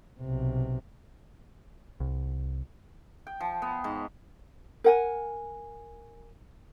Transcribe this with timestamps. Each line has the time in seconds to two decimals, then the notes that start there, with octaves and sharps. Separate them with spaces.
0.19 B1 C3
2.00 C2
3.27 G5
3.41 F3
3.62 B3
3.84 G#2
4.84 A#4 F#5 G#5